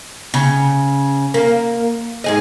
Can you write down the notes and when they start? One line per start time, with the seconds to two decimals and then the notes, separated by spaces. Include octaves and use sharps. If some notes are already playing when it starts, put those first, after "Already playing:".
0.34 C#3
1.34 A#3
2.24 G#2 G#4 D#5